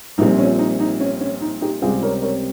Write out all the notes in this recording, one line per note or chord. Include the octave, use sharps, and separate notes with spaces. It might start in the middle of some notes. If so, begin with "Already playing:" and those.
A#1 A#2 G3 C4 D#4
C#4
D#4
D#4
C#4
C#4
D#4
D#4 G4
C#2 C3 G3 C4 F4 G#4
A#4 C#5
A#4 C#5